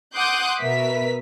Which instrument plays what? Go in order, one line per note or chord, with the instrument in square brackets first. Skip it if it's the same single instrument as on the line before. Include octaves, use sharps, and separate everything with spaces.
[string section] F#5 C6 D6 D#6 F#6 G6
B2 A#4 B4 E5 B6